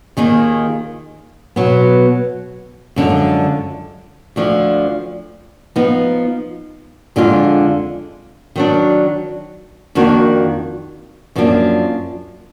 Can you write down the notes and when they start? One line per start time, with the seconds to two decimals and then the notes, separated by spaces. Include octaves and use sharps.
0.17 D#2 D#3 A#3 F4 G#4
1.56 B2 F#3 B3
2.96 F#2 D3 F3 G#3
4.36 D2 D3 F3
5.76 F3 B3 D#4
7.16 F2 D3 G#3 D4 F4
8.56 D#3 F#3 D4
9.95 F2 D#3 A#3 D4 F#4
11.36 F#2 F3 A#3 D4